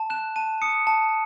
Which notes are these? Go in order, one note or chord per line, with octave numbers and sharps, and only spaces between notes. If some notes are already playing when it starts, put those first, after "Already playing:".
Already playing: A5
F#6 E7
A5 D#7
D#6 C#7
A5